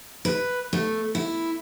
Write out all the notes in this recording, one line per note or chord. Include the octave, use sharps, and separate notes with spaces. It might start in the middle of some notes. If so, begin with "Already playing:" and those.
B4
A3
E4